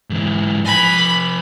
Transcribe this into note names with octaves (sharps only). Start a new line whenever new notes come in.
G#2 E3
F3 G#5 B5